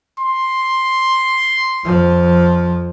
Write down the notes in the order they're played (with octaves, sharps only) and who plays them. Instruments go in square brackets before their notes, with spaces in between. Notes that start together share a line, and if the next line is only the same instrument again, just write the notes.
[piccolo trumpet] C6
[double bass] F2 F3